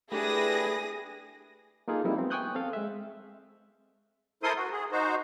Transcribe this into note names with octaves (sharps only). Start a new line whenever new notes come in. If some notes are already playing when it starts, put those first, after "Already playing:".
A3 D4 E4 G4 G#4 B4 D#6 A#6
A#3 D#4 F4 G#4 A4
F3 G3 A#3 C4 D#4 E4
B3 C4
G5 G#5 C#6 D#6 F#6 G6
C4 A4 F5
G#3 E5
E4 A4 A#4 C5 C6 D#6
F#4
G#4
D#4 F#4 C5